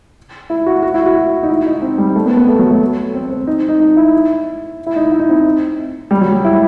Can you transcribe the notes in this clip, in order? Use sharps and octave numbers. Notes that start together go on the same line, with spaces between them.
E4
F#4
F#4
E4
F#4
D#4
E4
D#4
C4
G3
A3
B3
B3
A3
F#3
A3
C4
C4
D#4
D#4
D#4
E4
E4
D#4
E4
D#4
C4
G3
F#3
G3
E4